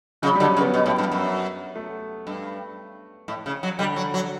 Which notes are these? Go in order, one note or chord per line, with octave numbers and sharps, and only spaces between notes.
C#3 F#3
D3 G3
C#4
C#3
B3
B2
A2
G2
F#2
A3
G2
A2
C#3
F#3
D3 G3
F#3
F#3